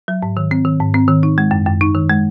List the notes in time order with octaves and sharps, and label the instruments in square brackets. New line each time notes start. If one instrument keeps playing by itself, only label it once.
[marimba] F#3
G#2
D#3
C4
D#3
G#2
C4
D#3
D#4
G#3
F#2
F#2
D#4
D#3
G#3